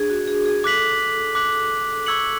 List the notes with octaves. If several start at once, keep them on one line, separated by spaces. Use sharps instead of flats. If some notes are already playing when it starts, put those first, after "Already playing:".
Already playing: D4 G#4
F#4
G#4
G#4
A4 D6 F#6 B6 F#7
D6 F#6 B6 F#7
C#6 E6 G#6 C#7 F#7